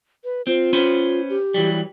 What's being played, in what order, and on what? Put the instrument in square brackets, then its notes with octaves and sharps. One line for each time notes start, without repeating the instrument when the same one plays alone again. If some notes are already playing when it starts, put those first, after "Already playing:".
[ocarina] B4
[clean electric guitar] C4 [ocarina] F4
[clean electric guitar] C#4 B4 C5
[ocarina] G4
[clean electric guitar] E3 F#3 G3